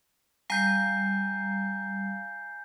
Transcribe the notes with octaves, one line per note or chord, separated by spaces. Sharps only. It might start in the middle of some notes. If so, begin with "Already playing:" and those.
G3 F5 G#5 A#5 G6 C7